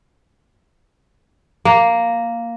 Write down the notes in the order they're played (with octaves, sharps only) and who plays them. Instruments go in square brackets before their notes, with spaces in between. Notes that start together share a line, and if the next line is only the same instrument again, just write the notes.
[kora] A#3